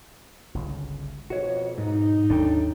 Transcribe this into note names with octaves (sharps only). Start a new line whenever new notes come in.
G1 C#2
F2 B2 F#4 C#5
G#2 D#4
G#1 D#2 F#3 D4 A4 G5